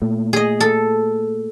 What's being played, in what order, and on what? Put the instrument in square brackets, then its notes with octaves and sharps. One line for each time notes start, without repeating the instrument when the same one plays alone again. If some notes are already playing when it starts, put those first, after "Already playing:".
[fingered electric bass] A#2 A3
[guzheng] G#4 D#5
A4